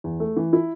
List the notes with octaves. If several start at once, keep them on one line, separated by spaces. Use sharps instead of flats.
E2
A3
E3
E4